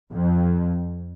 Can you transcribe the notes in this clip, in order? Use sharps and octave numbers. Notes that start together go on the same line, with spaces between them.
F2